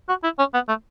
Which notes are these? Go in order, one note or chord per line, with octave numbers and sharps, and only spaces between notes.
F#4
E4
C#4
B3
A3